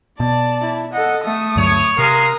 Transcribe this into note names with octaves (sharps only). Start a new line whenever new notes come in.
B2 D5 A5
E4
A4 D#5 F#5
A3 D#6
D2 G2 F#3 C#5
C3 G#3 G#4 A#4 F5 D#6